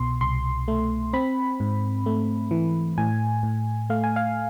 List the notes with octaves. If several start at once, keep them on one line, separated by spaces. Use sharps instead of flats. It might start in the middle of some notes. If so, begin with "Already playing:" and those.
Already playing: C2 B2 C6
C2 C6
A3
C4 B5
G#2
A3
E3
A2 G#5
A2
A3 F5
G#5
F5